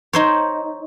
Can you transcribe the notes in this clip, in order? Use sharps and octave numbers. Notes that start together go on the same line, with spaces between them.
D#4 C5 C#5